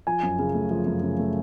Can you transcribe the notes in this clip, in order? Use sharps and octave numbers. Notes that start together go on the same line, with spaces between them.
F3 G#5
F#2
C#3
A3
F3
F#2
C#3
A3